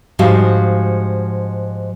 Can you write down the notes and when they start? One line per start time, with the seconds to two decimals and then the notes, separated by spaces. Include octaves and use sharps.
0.19 G#2 F3 G3 G#3 F#4 F5